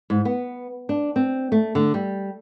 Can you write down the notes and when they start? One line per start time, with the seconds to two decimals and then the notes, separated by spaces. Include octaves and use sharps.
0.10 G#2
0.25 B3
0.89 D4
1.16 C4
1.52 A3
1.75 D3
1.94 G3